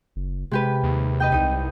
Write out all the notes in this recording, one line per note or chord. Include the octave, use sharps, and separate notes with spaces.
F#1
C3 G#3 G4 B4
D#2
B4 D#5 G5
C2 D#4 D#6